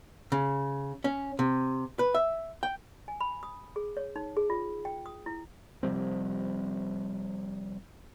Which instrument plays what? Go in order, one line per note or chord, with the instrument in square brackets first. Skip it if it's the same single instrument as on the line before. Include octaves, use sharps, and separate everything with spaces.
[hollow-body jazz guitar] C#3
C#4
C3
B4
E5
G5
[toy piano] G#5
B5
D#6
G#4
C#5
D#4
G#4
F4
G5
D#6
E4
[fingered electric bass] C3 F3 G3 C4